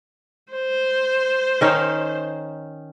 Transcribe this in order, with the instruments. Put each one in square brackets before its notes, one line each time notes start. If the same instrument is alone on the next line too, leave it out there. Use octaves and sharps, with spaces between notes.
[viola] C5
[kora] D#3 C#4 D#4